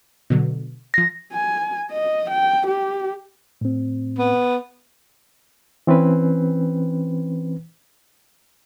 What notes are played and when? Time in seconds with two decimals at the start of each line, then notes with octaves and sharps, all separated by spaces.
0.30 B2 D3 F#3
0.94 F3 A#6 C7
1.33 G#5
1.91 D#5
2.30 G5
2.67 G4
3.61 A2 C4
4.18 B3
5.87 E3 C4 C#4 B4